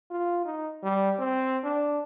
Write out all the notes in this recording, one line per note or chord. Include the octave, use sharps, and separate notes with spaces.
F4
D#4
G3
C4
D4